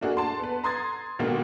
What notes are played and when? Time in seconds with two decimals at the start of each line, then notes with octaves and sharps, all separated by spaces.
0.01 A3 A#3 D4 F#4 G#4
0.17 A5 C6
0.39 B3 B4
0.64 A#5 C6 D#6 G#6 A6
1.19 D#2 B2 D3 G#3 A#3